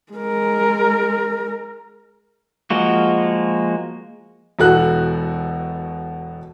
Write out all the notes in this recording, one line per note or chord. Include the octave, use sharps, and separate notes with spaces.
G#3 A#4
F3 G#3 A#3 F#4
E1 B2 F#4 A4 F#6